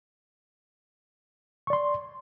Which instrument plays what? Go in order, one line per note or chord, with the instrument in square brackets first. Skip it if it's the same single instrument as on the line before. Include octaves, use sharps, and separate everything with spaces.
[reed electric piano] C#6
D5
C6